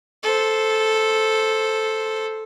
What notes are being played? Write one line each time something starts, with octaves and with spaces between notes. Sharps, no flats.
A4 C5